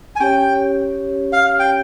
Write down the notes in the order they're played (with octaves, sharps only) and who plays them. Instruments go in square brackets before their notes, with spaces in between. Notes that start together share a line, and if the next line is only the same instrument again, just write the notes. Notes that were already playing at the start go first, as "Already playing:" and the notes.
[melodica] G#5
[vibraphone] C#4 G4 C#5 [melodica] G5
[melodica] F5
G5